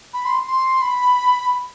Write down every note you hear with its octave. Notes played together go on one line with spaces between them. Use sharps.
B5
C6
C6
B5